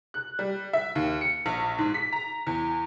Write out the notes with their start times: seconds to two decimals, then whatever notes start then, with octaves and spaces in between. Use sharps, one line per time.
0.14 F#6
0.39 G3
0.73 E5
0.95 D#2
1.21 C#7
1.46 A#1
1.78 G#2
1.94 B6
2.12 A#5
2.47 E2